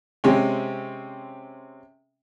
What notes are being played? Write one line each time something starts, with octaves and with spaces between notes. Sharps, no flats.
C3 G#3 C4 C#4